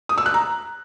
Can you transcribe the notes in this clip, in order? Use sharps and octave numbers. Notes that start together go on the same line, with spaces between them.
D#6
E6
F#6
A#5